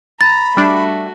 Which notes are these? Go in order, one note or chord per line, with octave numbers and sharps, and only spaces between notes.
A#5 B5 A6
G3 A3 D4 F#4